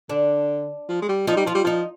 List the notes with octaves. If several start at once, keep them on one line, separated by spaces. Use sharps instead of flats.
D3 D4
F3
G#3
G3
F3 D#4
G3
F3 F4
G3
F3 D#4